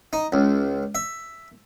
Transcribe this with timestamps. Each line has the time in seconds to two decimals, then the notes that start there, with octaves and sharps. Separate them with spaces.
0.13 D#4
0.32 C#2
0.95 E5